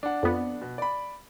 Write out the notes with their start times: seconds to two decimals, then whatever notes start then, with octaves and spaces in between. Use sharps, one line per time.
0.03 D4 F#5
0.23 F2 B3
0.61 B2
0.78 D5 B5